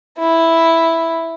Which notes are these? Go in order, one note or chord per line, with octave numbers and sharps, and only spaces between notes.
E4